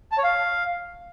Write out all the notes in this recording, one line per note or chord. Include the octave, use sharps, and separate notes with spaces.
A5
C#5
F5